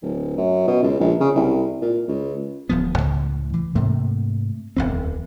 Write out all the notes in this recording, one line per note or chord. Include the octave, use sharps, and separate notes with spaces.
D1
F#2
B2
C#2
A#1
C#3
C2
A#2
C#2
D1 F3 B3
C#2 A2
E3
G#2 C3 A3 A#3
D1 G#1 E2 C4